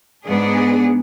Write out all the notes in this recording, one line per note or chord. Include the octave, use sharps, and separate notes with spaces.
G#2 B3 D4 G#4